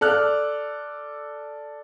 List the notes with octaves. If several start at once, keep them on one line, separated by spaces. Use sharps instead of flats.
A4 D5 F6 F#6